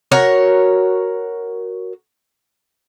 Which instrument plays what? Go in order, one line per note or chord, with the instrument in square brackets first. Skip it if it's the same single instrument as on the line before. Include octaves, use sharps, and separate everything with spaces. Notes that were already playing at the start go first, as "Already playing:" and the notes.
[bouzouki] F#4 A#4 C#5